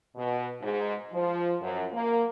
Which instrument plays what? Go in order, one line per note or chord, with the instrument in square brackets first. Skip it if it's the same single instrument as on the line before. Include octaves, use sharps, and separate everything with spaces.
[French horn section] B2
G#2
F3
F#2
A#3